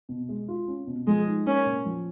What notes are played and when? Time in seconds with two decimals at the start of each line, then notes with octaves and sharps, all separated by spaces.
0.09 B2
0.29 G#3
0.48 F4
0.68 C#4
0.87 B2
1.07 F3 G#3
1.26 D#4
1.46 A#3 C#4
1.66 A#2
1.86 F3